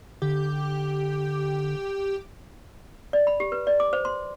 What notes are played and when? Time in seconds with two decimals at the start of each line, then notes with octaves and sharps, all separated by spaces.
0.22 D3 G4
3.13 D5
3.27 B5
3.40 G4
3.52 B4
3.67 D5
3.80 D6
3.93 C5
4.05 C6